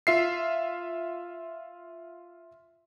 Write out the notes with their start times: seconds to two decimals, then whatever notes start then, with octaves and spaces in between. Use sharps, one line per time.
0.07 F4 E5 C7